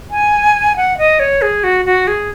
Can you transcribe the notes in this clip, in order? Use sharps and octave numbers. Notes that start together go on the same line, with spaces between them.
G#5
F#5
D#5
C#5
G#4
F#4
F#4
G#4